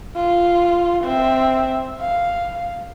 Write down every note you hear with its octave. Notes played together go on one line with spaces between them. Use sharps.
F4
C4 E5
F5